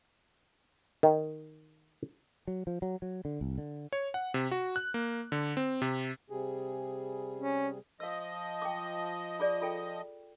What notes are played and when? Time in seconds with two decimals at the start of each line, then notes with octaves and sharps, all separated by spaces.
1.03 D#3
2.48 F#3
2.67 F3
2.82 F#3
3.02 F#3
3.25 D3
3.41 C2
3.58 D3
3.93 C#5
4.14 F#5
4.34 C3
4.51 F#4
4.76 F#6
4.94 A#3
5.32 D3
5.57 C4
5.82 C3
6.30 C3 G3 G#4
7.37 C#4
8.00 F3 D#5 F5 E6
8.62 G5 D6
9.40 F4 G#4 D5
9.62 F4 A4 G5